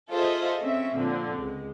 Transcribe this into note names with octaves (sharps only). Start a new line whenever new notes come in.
F4 G#4 A4 C5 D#5 E5
C4 C#4 E5
A#2 D3 F3 C4
C#2 G#3